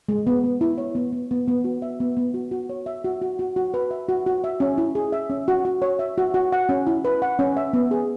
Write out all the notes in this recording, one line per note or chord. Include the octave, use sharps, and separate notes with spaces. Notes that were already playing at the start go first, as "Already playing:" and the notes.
G#3
B3
B3
E4
C#5
B3
B3
B3
B3
F#4
E5
B3
B3
F#4
F#4
C#5
E5
F#4
F#4
F#4
F#4
B4
E5
F#4
F#4
E5
C#4
E4
G#4
E5
C#4
F#4
F#4
C#5
E5
F#4
F#4
F#5
C#4
E4
B4
F#5
C#4
E5
B3
G#4